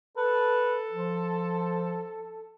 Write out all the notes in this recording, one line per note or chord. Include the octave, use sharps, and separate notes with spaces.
A4 B4
F3